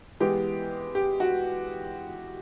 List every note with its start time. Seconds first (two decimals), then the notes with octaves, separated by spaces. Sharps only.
0.20 E3 G#3 B3 G4
0.95 G4
1.20 F#4